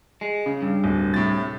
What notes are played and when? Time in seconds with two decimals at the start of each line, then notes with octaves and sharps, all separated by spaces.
0.21 G#3
0.46 C#3
0.62 G2
0.84 D1
1.14 A2 C3 A6